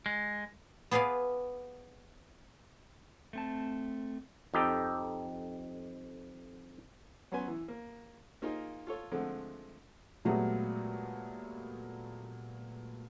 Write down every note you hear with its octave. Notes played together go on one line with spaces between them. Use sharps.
G#3
B3 G#4 B4 D5 F5 G#5
A3 C4 A5
F2 D#4 G4 A4 G5
F#3 B3 C#4 B4 G#5 C6
E3
A#3
A#3 D#4 F4 G#4
F4 A4 C#5
D3 F3 G#3 A3 C4
A#2 F#3 G#3 A3 B3 G4